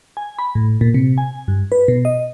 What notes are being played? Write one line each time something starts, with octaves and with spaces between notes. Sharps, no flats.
G#5
B5
A2
A#2
C3
G#5
G2
B4
B2
D#5